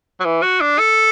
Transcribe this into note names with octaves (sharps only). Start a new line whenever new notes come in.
F#3
E3
F#4
D4
A4